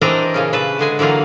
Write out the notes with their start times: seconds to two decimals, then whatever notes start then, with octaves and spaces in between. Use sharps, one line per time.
0.01 E3 C4 D4 G4 A#4 D#5
0.34 A#2 C#3 C#4
0.53 C#3 B4 E5 A5
0.79 D3 G#3 G#5
0.99 D3 E3 F#3 A#3 F4